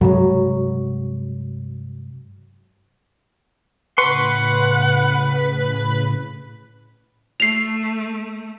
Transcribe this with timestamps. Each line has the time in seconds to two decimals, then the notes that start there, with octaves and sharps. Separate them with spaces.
0.01 G2 C3 F#3 G#3
3.98 A2 C#3 B4 F#5 C6 C#6
7.40 A3 C7 F7